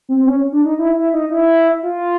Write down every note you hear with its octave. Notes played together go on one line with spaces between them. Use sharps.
C4
C#4
D4
D#4
E4
E4
D#4
E4
F4